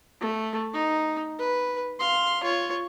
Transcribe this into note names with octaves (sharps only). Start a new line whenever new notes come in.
A3
D#4
B4
F5 C6
F4 C#5